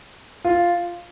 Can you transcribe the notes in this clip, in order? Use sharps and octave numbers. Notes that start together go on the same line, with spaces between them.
F4